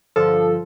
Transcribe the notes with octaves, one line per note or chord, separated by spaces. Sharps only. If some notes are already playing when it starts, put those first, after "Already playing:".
G2 D3 F3 A4